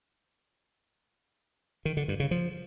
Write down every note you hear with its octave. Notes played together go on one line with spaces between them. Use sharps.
D#3
D3
G2
C#3
F3